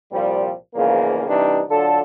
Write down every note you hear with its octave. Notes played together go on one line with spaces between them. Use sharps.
C2 A#2 F3 G3
E2 G#2 C#3 F3 A#3
C3 E3 G3 C4 D4 D#4
D3 F#3 D4 F4 A4